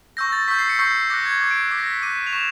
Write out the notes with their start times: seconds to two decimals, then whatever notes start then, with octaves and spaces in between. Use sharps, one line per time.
0.17 C#6 E6 G6 A#6
0.32 A6
0.48 C#6 E6 G6 B6
0.59 C7
0.69 C#7
0.79 C#6 E6 G6 C7
1.10 D6 F#6 A#6
1.26 G#6
1.40 D6 F#6 G#6
1.51 D7
1.71 D6 F#6 B6
1.78 A#6
1.87 B6
2.02 D6 F#6 D#7
2.27 F7
2.33 C#6 E7